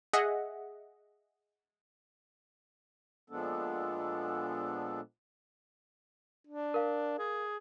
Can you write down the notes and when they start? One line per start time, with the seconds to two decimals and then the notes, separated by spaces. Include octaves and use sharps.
0.13 G#4 D#5 E5 F#5
3.30 A#2 F3 G#3 B3 D4 A4
6.47 D4
6.74 A#4 F5
7.19 G#4